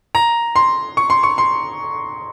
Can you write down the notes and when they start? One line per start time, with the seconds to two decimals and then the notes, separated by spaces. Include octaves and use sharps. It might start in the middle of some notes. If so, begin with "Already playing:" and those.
0.15 A#5
0.56 C6
0.97 C#6
1.10 C6
1.23 C#6
1.38 C6